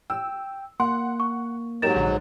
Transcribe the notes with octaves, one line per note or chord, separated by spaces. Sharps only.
G5 E6
A#3 F#5 C6
C#6
G#2 F#3 D#4 G4 A#4 A6 E7
A#1 D3